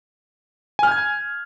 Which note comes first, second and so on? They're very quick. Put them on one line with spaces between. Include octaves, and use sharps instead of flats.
G#5 F6 G6 G#6